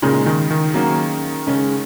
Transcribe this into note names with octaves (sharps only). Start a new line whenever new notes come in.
A#2 C#3 G#3 D#4 G#4
D#3
D#3
F#3 A#3 C#4
C#3 G#3 C#4